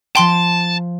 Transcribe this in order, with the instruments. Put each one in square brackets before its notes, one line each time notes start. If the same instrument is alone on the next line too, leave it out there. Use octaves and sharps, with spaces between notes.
[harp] F3 C7 [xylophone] G5 C6 G7 [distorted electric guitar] A5